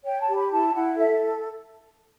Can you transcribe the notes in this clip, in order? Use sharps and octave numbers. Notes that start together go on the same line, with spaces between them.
C#5 G5
A5
G4
B5
E4 A5
E4 F#5
A4 E5